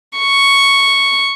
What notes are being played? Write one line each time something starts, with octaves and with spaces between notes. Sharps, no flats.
C#6